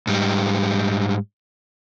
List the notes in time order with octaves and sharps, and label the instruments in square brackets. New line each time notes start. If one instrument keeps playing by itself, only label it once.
[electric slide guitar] G#2 G3